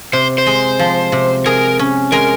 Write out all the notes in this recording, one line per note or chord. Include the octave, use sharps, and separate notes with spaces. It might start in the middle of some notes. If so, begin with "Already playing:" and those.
C3 C5
C5
G#3
F3
C3
G#4 A#4
C#4
G#3 A#4